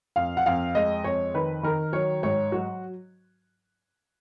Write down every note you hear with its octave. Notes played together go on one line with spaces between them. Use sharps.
F2 F5
F#5
F2 F5
G#3 D#5
F2 C#5
D#3 B4
D#3 A#4
F#3 C#5
G#2 C#5
F#3 F#4